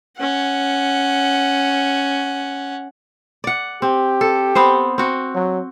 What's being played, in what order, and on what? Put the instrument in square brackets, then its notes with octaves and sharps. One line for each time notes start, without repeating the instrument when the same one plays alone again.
[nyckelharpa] C#4 F#5
[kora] D5 F#5
[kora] C4 [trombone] G4
[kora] A4
B3 C4 C5
C4 F#4
[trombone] F#3